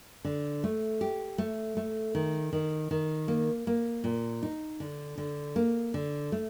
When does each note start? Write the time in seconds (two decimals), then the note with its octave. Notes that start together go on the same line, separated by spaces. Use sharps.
0.25 D3
0.64 A3
1.01 G4
1.38 A3
1.77 A3
2.15 D#3
2.53 D#3
2.91 D#3
3.28 A#3
3.67 A#3
4.04 A#2
4.43 D#4
4.80 D3
5.18 D3
5.56 A#3
5.94 D3
6.32 A3